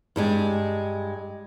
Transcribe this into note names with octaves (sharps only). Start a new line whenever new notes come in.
G2 G3 G#3